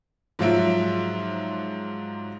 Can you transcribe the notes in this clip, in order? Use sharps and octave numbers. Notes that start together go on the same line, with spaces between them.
G#2 F3 F#3 F4 E5 D7